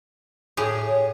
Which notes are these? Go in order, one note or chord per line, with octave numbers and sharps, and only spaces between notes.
A2 G4 G#4
C#5